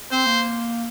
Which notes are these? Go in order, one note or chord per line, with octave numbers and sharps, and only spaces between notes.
C4 C5
A#3